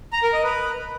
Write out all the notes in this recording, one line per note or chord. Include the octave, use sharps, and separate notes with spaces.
A#5
A#4
D#5
B4